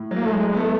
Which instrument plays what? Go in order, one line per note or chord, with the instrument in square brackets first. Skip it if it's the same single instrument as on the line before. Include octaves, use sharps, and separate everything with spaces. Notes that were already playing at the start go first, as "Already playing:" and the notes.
Already playing: [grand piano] A2
F#3
[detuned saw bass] A#3
A3
G#3
G#3
[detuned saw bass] A3 [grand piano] B3